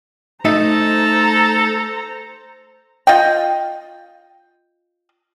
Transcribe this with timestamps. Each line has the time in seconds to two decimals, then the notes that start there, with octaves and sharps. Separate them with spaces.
0.45 A3 D#4 A4 C5 E5 A#5
3.07 F4 D#5 G5